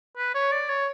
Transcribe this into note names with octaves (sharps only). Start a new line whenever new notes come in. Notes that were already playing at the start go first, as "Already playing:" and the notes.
B4
C#5
D5
C#5